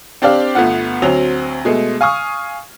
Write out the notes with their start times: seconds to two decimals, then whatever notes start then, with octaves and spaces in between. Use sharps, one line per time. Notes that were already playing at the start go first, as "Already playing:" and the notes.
0.22 C4 D4 G4 D5 F5
0.55 G1 A3 B3 F4 F#5
1.02 D2 F#3 C4 F7
1.65 B2 G#3 A3
2.01 F5 G#5 C#6 D#6 F6